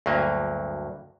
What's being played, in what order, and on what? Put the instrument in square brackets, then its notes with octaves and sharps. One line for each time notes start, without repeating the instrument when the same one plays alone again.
[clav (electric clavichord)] D2 G2 F#3 A#3